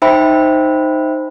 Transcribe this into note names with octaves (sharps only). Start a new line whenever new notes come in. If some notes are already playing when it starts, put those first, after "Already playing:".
D#4 C5 E5 G5 B5